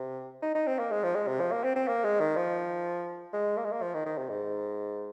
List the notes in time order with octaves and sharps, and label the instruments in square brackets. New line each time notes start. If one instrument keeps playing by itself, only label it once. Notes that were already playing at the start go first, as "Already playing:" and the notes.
Already playing: [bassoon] C3
D#4
D#4
C4
A#3
G#3
F3
G#3
C3
F3
A#3
C4
C4
A#3
G#3
D#3
F3
G#3
A#3
G#3
A#3
F3
D#3
D#3
C3
G#2